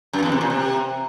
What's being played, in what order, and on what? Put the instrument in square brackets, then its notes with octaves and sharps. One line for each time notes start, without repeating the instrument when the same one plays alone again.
[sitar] F#2
E2
C3
A#2
C3